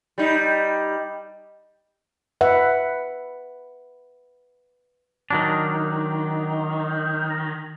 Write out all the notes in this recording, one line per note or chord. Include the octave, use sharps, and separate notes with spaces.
G3 D#4
B4 E5 F#5
D#3 F#3 D4